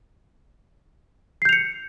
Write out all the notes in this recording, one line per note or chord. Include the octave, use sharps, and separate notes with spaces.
G6 C7 C#7 F7